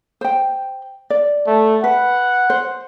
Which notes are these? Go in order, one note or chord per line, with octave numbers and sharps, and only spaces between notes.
C5 G5
D5
A3
B4 F#5
C5